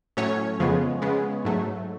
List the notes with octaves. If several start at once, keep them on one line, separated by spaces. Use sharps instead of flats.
A2 F#3 A3 C#4 C#5
F2 C#3 F3 G#3 B3
C#3 G#3 B3
G#2 F#3 A3